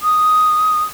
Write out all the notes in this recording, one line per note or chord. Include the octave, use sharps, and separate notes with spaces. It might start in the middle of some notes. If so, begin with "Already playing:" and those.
D#6